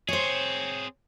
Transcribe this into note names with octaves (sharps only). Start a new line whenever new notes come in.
C4 G#4 C5 C#5